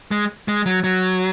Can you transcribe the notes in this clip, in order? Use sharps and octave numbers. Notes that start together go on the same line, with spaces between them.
G#3
G#3
F#3
F#3